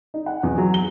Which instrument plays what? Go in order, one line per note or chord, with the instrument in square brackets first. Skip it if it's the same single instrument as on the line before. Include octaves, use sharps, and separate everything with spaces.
[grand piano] D#4
F#5
E2
F#3
G7